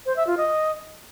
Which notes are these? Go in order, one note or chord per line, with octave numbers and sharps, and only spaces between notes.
C5
E5
F4
D#5